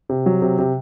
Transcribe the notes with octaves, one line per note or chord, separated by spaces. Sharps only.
C3
F#3
C3
C3